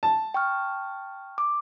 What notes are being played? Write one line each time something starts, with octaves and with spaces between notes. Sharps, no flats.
A5
G5 C#6 F6
D6